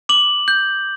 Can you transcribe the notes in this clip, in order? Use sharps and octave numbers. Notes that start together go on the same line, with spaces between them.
D6 F#7
G6